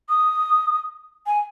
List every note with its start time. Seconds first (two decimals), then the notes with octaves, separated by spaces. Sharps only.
0.09 D#6
1.26 G#5